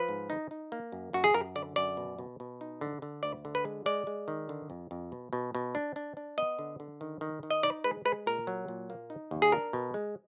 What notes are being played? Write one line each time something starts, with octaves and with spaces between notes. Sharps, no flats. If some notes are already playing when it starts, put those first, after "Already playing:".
Already playing: F3 B4
G#2
D#4
D#4
A#3
F#2
F#2 F#4
G#4
F#2 A#4
D3 D5
F#2 D5
B2
B2
B2
D#4
D3
D3
D2 D5
D3
B4
G#3
G#3 D5
G#3
D#3
D3
F2
F2
B2
B2
B2
D4
D4
D4
B3 D#5
D3
D3
D#3
D#3
D#3
D#5
D#4 D5
G#3 B4
G#3 B4
A#2 A#4
F#3
A#2
A#3
D#4
D#2
G#4
D4 A#4
B2
G#3